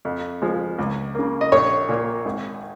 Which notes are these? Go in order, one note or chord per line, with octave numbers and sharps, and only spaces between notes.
F2
F3 G#3
C#2
C#3 A#3
D#5
A#1 C#5
A#2 A#3
G#1